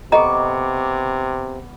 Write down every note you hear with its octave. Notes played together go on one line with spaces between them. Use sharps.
C3 B3 A4 D#5 A#5 C#6 D6